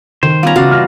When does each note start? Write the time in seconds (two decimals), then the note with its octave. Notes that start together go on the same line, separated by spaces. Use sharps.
0.23 D#3 C5
0.43 G3 B3 C#4 F4 A#5
0.56 C#3 E3 G3 F#4 D5 F5
0.71 F6 A#6